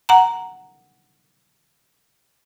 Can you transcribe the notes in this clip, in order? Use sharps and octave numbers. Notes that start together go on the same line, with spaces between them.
F#5 A#5